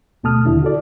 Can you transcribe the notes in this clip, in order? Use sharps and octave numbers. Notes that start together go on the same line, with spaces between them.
D2 B2 A3 A5 D#6 F6
D#2 D3 E4
F#4 A4 D5